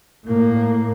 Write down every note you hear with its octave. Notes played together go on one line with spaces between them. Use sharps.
A2 A#3